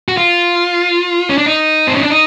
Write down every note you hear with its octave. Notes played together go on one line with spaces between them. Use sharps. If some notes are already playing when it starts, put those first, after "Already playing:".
F#4
F4
C#4
D4
D#4
C4
C#4
D4
D#4